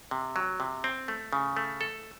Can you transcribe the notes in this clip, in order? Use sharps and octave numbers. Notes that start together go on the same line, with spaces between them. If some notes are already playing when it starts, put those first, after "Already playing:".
C3
F#3
C3
C4
A3
C#3
A3
A4